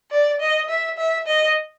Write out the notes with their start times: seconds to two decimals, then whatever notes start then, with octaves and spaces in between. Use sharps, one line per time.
0.11 D5
0.40 D#5
0.69 E5
0.98 E5
1.27 D#5